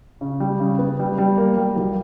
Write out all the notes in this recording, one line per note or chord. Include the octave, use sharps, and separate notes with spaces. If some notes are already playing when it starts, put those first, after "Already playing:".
C#3
G3
C#3
B3
G3
G3
A#3
G3
B1